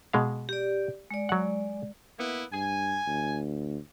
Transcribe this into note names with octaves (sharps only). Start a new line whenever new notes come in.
B2 G#3 F5
G4 D5
G#3 D5
F#3 F#5
A#3 B3 E4
G2 G#5
D2